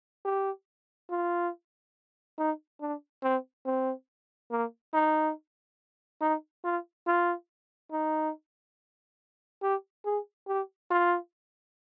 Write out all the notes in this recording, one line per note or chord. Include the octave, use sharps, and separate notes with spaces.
G4
F4
D#4
D4
C4
C4
A#3
D#4
D#4
F4
F4
D#4
G4
G#4
G4
F4